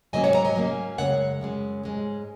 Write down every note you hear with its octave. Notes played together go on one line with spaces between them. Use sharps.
G#2 F#3 A#3 C#4 D#5 G#5
C#5 F#5
F#5 A#5
D#5 G#5
G#2 F#3 A#3 C#4
F#2 C#3 G#3 C#5 F#5
F#2 C#3 G#3
G#2 G#3 C#4